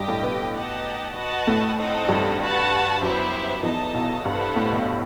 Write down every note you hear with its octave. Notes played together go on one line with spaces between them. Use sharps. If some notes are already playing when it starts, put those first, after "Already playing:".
Already playing: G2 G3 G4 D#5 G5
A2 A3
B2 B3
D#4 G4 D#5 F#5 A5
F#4 B4 D#5 F#5 A5
A2 A3
C4 D#4 A4 D#5 F#5
G2 G3
F#4 B4 F#5 A5
F#2 F#3 B3 E4 G4 C5 E5
E2 E3 D#4 A4 D#5 A5
B1 B2
G2 B3 E4 A4 C5 F#5
A2
B1 B2